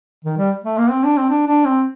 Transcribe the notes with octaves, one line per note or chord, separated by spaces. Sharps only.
D#3
G3
A3
A#3
C4
D4
C4
D4
D4
C4